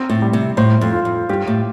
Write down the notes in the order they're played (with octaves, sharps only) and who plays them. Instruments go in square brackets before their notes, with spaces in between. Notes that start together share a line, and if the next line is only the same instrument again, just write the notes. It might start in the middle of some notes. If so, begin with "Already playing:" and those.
Already playing: [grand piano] C4
[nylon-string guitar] A2
[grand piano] G3
[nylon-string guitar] C3
[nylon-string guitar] A2 [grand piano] C5
[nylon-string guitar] F2
[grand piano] F4
[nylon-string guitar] F2
[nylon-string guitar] G2 [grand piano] G4
[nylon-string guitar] A2